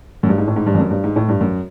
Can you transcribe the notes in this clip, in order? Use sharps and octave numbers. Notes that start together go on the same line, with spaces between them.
F#2
G2
G#2
A2
G#2
G2
F2
F#2
G2
G#2
A2
G2
F#2